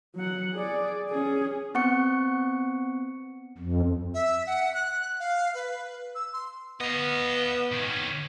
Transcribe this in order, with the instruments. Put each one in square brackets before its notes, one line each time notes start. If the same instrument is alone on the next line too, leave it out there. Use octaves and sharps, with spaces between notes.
[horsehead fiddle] F#3 F#5
G#4 D5
C#4 G#4
[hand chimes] B3 C4 F#5 C#6 C#7
[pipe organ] F2
[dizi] E5
F#5
F#6
F5
B4
E6
C6
[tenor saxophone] B3 [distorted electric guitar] D#5 F5
[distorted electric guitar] D#3 C#4